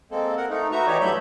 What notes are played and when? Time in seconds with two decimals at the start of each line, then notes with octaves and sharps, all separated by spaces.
0.11 G#3 A#3 C4 A4
0.37 A#4 F#5
0.50 A3 D#4
0.72 F#4 B4 E5 A#5 C#6
0.87 E3 D#4 F#4 G4 C#5 D5
1.01 G2 F#3 A3 E5 B5 G6